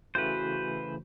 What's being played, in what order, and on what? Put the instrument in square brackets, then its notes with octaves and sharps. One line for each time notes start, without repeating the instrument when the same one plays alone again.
[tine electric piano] C#3 E3 A3 [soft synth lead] F#4 [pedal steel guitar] B4 C5